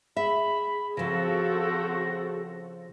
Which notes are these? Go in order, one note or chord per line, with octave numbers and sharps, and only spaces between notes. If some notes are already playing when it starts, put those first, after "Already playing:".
G#4 E5 B5
C#3 F3 C4 F#4 A4 A#6